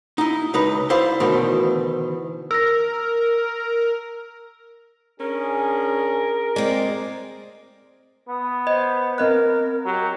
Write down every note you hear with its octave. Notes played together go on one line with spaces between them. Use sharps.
D#4 E4
C#2 D#4 B4
E4 C5 D5 F5
D2 B2 D#3 E3 C#4
A#4 E6 A#6
C#4 D4 G#4 A#4
G#3 C4 D5
B3 D#6
C5 D#5
C4 A#4 D#5 F#6
F#3 G4